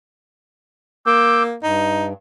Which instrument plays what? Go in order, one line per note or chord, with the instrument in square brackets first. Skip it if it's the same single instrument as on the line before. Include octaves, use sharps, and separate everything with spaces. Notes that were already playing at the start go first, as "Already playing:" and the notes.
[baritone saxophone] A#3 [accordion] D6 E6 G6
[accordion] G2 [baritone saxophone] D#4